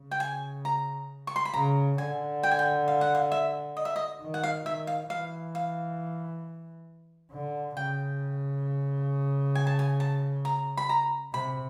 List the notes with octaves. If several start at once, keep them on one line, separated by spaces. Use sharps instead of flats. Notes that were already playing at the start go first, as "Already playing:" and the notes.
Already playing: C#3
G5
G#5
A#5
C#6
C6
B5
C#3 A#5
D3 G#5
G5
G#5
G5
F5
F#5
F5
E5
D#5
E5
D#5
D#3
F#5
F5
D#3 E5
F5
E3 F5
F5
D3
C#3 G5
G#5
A5
G#5
A5
A#5
B5
A#5
C3 B5